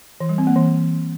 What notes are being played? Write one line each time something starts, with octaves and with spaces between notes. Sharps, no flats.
E3
G3
C4
A#3
E3